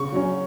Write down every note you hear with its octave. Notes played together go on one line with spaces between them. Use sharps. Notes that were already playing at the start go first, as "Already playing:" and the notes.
Already playing: C#3 C#6
F#3 C#4